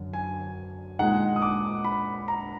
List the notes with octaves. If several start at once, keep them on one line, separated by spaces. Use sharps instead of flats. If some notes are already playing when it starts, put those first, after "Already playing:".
Already playing: F#2 D3 F#3 D4
G#5
A#2 G#3 D#4 F#5
D#6
D6
B5
A#5